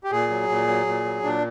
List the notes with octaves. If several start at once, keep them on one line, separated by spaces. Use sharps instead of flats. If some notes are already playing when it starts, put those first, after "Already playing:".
G4
A#2 G#4
F#3
A#2
F#3
A#2
F#3
A#2 D4